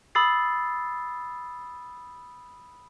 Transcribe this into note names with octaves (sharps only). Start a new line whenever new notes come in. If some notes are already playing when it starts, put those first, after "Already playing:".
B5 D#6 E6 A6 C7